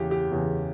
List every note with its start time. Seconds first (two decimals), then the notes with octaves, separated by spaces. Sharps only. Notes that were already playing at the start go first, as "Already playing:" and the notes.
Already playing: E2 C#3 E3 G4
0.11 G4
0.32 E2 C#3 E3